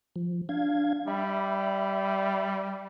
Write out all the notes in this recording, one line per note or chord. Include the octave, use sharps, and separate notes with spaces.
F3
D4 F5 G#6
G3 E5 B5